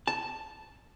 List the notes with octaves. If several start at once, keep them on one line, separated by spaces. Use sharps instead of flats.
A5